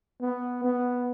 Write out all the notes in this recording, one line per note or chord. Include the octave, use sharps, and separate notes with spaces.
B3
B3